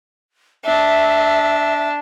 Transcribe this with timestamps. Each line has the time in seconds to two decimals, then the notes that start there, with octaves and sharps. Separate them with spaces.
0.64 D4 E5